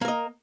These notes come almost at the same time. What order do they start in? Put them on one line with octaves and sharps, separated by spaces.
A#3 A#4 D#5